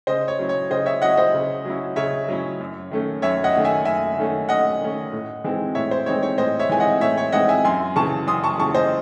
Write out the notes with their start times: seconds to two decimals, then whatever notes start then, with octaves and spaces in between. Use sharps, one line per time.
0.07 C#3 C5 D#5
0.28 C#5
0.39 F#3 C#4 E4
0.49 C#5
0.70 C#3 C5 D#5
0.86 C#5 E5
1.02 F#3 C#4 E4 D#5 F#5
1.17 C5 D#5
1.34 C#3
1.65 F#3 C#4 E4
1.96 C#3 C#5 E5
2.28 F#3 C#4 E4
2.60 F#2
2.91 D#3 A3 C#4
3.22 F#2 C#5 E5
3.44 D#5 F#5
3.55 D#3 A3 C#4
3.65 E5 G#5
3.85 F#2 E5 G#5
4.17 D#3 A3 C#4
4.49 F#2 D#5 F#5
4.81 D#3 A3 C#4
5.12 A2
5.44 E3 G#3 C4 D#4
5.75 A2 C#5 E5
5.91 C5
6.06 E3 G#3 C4 D#4 C#5
6.23 C#5
6.38 A2 C5 D#5
6.59 C#5 E5
6.69 E3 G#3 C4 D#4 G#5
6.80 D#5 F#5
7.01 A2 C#5 E5
7.18 C#5
7.32 E3 G#3 C4 D#4 D#5 F#5
7.49 E5 G#5
7.65 F#2 G#5 C6
7.96 C#3 E3 A5 C#6
8.27 F#2 C6 D#6
8.44 A5 C#6
8.59 C#3 E3 A5 C#6
8.74 C5 D#5